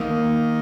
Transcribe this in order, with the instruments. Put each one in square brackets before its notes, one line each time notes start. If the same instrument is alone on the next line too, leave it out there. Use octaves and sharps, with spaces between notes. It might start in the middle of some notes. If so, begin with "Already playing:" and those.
Already playing: [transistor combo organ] D#3 [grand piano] A#3